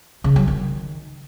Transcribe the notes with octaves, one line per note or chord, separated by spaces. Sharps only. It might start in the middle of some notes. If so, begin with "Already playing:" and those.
C#3
F#3
D#3